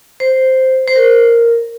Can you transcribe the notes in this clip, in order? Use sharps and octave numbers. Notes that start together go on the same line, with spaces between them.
C5
C5
A#4